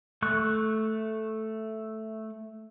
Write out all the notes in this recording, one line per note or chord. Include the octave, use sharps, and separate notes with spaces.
A3 C#6 F#6